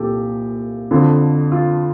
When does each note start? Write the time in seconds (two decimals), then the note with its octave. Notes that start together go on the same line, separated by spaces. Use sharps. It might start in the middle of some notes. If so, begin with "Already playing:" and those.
Already playing: C2 A#2 F3 G4 A4
0.91 F2 D3 F3
1.52 F4